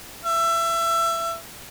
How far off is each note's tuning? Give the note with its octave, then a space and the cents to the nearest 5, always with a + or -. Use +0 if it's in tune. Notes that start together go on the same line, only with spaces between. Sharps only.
E5 +25